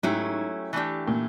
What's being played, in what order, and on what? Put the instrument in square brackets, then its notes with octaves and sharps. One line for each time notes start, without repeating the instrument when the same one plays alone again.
[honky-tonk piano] G#2 [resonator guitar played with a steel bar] F#3 A3 C#4 E4 G4
[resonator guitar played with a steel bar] E3 A3 D4 G4
[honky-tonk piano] A#2